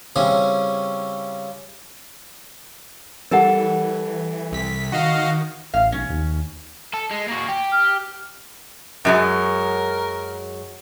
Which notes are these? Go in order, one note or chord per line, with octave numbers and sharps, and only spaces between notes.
C#3 G3 C4 C#4 E4 G#4
E3 G3 A4 A#4 F#5 A5
C2 B6
D#3 F#4 D#5 F5
A1 F5
B1 C#4
D#2
A4
G#3
A#3 F#4
G4
F6
F#2 F#3 G#3 A#4